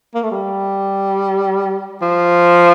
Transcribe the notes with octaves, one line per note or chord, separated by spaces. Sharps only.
A#3
A3
G3
F3